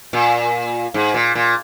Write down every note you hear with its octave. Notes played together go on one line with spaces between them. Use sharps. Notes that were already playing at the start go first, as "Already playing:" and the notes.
A#2
G#2
A#2
A#2